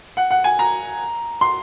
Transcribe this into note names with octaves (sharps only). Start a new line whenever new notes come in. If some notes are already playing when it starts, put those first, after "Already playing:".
F#5
F#5
G#5
A#5
C6